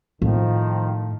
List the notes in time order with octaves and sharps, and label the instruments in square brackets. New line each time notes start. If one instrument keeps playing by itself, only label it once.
[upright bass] A2 [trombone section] D#3 F3